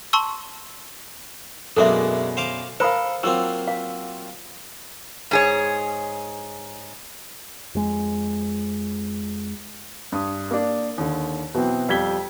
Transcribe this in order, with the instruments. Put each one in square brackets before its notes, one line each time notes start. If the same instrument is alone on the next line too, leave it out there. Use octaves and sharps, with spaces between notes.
[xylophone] A5 C6 C#6 E6
[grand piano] F#2 B2 F#3 [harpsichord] G#3 A#3 D4 [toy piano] A4 E5
[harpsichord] C5 F5 D6
[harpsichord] A4 [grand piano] A#4 F5 [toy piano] C5 B5 D#6
[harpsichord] F#3 A#3 C4 [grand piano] F4 E6
[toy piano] F5
[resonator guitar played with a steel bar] G#2 G#4 C#5
[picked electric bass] F2 G#3
[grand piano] G2 D#6
A#3 D4
D#2 D3
B2 E3 F#3 B3 C4
F2 G3 G5 G#6 B6 G7